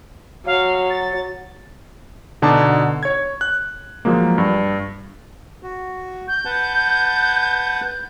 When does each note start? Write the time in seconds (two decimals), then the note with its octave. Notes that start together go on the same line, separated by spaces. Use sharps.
0.46 F#3 F5
0.90 A6
2.42 B2 D3 D#4 F#4 A5 D6
3.03 C#5 G#6
3.41 F#6
4.05 F3 F#3 G#3 A#3
4.38 G2
5.63 F#4
6.28 G6
6.45 B4 F#5 A5